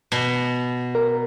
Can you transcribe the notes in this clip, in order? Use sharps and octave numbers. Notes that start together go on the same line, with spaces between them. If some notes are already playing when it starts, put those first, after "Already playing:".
B2
A#4